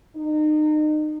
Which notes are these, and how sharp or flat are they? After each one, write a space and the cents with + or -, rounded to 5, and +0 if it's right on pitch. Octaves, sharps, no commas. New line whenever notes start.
D#4 -30